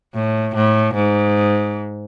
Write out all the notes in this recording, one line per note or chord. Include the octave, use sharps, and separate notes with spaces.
A2
A2
G#2